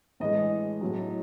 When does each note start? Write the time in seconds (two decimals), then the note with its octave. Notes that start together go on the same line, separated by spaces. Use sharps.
0.20 A2 E3 G#3 D#5
0.81 A2 F#3